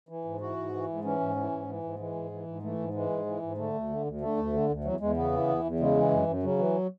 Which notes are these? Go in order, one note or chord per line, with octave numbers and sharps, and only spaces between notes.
E3
G#2
E3 F#4
G#2
E3
G#2
E3 C#4
G#2
E3
G#2
E3
G#2
E3 G#3
G#2
E3
G#2
E3 A3
G#2
E3 G#3
G#2
E3
G#2
D3 A3
D2
D3
D2
D3 A3
D2
D3
D2
E2 F#3
E2 G#3
C#3 B3
E3
E2
E2
C#3 G#3
E3
F#2
F#2
C#3 F#3
E3